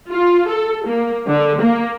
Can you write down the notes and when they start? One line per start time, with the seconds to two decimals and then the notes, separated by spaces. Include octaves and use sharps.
0.11 F4
0.48 A4
0.86 A#3
1.28 D3
1.59 A#3